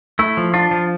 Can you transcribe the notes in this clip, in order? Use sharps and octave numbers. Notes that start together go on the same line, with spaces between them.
A3 E4
F3
D4 F4
F3